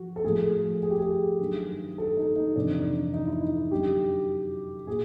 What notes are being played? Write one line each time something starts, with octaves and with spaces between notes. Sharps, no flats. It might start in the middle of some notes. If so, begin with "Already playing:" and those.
Already playing: F3 F#4
A4
A2 F3 G#4
G#4
G4
G#4
G2 D#3 F#3
A4
D#4
D#4
F2 C3 E3 D4
D#4
D#4
D#4
E4
D#4
F#2 D3 F#3 G4
A#2 G#4